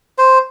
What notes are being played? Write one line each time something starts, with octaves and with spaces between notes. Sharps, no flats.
C5